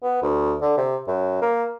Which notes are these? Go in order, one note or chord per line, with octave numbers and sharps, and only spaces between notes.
B3
D2
D3
C3
F#2
A#3